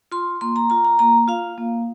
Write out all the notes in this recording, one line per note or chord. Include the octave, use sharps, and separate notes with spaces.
F4 C6
A#3 C6
A#5
F4 A#5
A#5
A#3 A#5
F4 F5
A#3